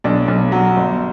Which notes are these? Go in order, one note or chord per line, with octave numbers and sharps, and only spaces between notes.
B1 D4
B1
F#3
G1